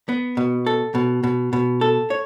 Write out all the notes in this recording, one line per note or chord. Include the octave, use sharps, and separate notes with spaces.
B3
B2
A4
B2
B2
B2
A4
C#5